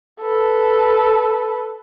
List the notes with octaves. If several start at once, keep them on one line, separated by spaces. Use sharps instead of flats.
A4 B4